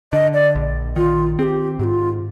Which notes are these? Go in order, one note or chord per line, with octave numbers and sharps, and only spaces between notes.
D3 D#5
D5
A#1
D#3 F4
C4 G4 G#4
G#2 F4 G4